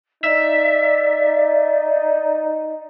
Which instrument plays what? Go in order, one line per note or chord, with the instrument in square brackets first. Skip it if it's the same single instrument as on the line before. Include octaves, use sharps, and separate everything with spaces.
[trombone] D#4 [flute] D5 [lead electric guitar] E5